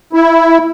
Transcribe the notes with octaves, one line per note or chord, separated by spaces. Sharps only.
E4